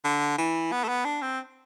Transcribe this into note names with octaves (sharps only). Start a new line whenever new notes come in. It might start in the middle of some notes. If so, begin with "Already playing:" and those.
D3
E3
B3
A3
B3
D4
C4